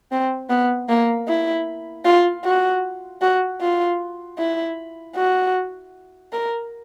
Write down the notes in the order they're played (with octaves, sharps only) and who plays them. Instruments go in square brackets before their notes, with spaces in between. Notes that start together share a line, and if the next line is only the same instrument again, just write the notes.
[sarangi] C4
B3
A#3
E4
F4
F#4
F#4
F4
E4
F#4
A#4